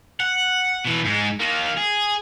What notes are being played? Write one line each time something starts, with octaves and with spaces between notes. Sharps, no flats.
F#5
B2 E3
G#2 G#3
D#3 A#3
G#4